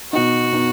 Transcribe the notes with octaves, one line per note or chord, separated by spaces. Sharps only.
B2 B3 D#4 F#4
B2 B3 D#4